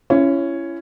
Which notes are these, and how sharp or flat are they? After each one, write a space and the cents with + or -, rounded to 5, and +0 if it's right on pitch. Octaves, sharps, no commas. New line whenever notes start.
C#4 +0 E4 +35